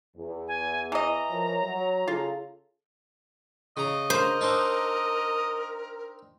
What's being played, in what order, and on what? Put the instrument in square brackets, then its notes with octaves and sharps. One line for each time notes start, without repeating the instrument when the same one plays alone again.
[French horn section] E2
[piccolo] G#5
[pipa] E3 D#5 [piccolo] A#5
[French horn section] F3 A#4 C#5
F#3
[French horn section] C#3 G#4 A4 [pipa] F4
[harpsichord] C#3 A#5 [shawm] D#5
[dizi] A#4 [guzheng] C5
[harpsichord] C4 D4 D#4